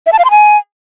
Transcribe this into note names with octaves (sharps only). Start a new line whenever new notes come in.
E5
A5
F5
C6
G#5